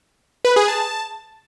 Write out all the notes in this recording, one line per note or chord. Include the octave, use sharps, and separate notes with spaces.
B4
G#4
A5